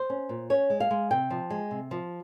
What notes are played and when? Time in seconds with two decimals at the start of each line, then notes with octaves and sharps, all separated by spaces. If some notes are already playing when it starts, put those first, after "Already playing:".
Already playing: C5
0.10 C#4
0.29 A#2
0.50 C#4 C#5
0.70 G#3
0.80 F5
0.91 G#3
1.11 C3 G5
1.30 F3
1.50 G#3
1.71 C3
1.91 F3